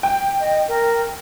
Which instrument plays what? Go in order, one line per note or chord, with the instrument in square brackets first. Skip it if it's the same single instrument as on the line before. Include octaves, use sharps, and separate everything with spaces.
[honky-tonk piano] G5
[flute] D#5
A#4